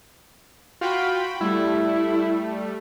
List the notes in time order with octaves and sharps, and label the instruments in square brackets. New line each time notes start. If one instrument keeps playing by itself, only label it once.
[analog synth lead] F4 [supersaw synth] F#4 G5 B5
[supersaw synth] G3 A3 [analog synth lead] E4